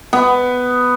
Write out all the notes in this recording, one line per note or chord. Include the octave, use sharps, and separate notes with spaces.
B3